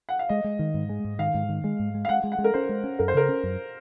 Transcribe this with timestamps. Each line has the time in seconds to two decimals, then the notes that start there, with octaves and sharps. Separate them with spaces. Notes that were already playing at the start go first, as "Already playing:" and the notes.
0.09 F#5
0.19 F5
0.29 G#3 D#5
0.44 G#3
0.59 D#3
0.74 G#2
0.89 G#3
1.05 G#2
1.19 D#3 F5
1.34 G#2
1.49 D#3
1.64 G#3
1.79 G#2
1.94 G#3
2.05 F5
2.09 G#3 F#5
2.24 G#3
2.32 F#5
2.38 G#3
2.44 A#4
2.54 C#4 C5
2.69 G#3
2.84 C#4
2.99 F#2 A#4
3.08 C5
3.14 C#3 A#4
3.29 C#4
3.43 F#2